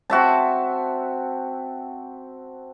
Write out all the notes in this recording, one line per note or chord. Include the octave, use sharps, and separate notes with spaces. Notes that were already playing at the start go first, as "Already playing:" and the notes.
C4 F#4 E5 A5